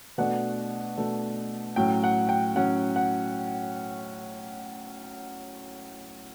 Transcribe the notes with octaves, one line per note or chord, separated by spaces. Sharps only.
B2 A3 D4 F#5
B2 A3 D4
A2 F#3 C#4 G5
F#5
G5
A2 F#3 C#4 F#5
F#5